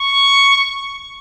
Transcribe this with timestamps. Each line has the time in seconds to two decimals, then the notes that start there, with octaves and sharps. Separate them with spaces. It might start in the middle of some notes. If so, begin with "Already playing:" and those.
Already playing: C#6